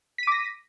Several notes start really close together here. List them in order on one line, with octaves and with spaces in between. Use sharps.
B6 D#7 D6 A#6